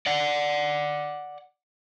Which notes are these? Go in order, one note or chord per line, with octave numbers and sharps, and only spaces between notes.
D5 F#5